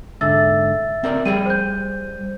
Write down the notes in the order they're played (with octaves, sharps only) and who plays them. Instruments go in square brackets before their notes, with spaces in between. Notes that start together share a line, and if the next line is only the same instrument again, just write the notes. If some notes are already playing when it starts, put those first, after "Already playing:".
[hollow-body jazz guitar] G#2 D3 [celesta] E5 E6 A6
[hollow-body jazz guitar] C4 A#4 D5
[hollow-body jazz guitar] G3 G#4 G5 [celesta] D#7
[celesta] C5 G6